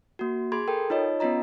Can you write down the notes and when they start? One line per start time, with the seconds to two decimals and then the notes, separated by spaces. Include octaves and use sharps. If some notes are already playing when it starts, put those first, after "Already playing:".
0.19 A#3 F#4
0.52 G#4 B5 C6 G#6
0.68 A4 A#4 G5
0.90 D#4 F4 C#5 D#5
1.20 B3 C#4 F4 D#5 A#5